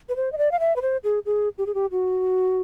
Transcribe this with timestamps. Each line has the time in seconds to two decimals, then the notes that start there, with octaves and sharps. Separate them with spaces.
0.09 B4
0.16 C5
0.32 D#5
0.38 D5
0.52 F5
0.60 E5
0.76 B4
0.82 C5
1.04 G#4
1.26 G#4
1.58 G4
1.66 G#4
1.74 G4
1.91 F#4